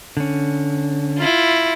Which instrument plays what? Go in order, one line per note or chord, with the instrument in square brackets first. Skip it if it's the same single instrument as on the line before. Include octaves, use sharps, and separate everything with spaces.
[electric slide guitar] D3 C#4
[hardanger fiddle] E4 F4